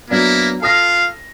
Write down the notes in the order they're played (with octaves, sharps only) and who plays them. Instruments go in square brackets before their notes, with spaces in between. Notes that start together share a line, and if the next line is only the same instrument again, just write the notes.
[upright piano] F#3 B3 D4 [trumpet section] A#3 E4
[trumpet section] F4 F5 [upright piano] A4 D#6 A#6